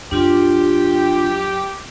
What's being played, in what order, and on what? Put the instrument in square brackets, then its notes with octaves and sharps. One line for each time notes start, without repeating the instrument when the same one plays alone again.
[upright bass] F#2 [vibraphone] D4 F4 C6 [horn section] G4